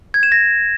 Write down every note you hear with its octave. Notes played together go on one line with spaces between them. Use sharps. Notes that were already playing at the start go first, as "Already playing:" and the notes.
G#6
E7
A#6